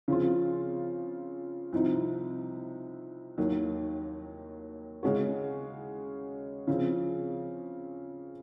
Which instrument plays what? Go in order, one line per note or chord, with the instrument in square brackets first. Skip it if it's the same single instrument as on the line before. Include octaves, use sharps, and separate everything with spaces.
[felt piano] C#3 F3 C4 F4
C2 C3 F3 C4 D#4
D#2 D#3 F#3 A#3
C#3 G#3 C#4 F#4
C#3 F3 C4